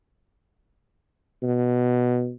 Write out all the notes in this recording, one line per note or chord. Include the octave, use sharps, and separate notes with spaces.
B2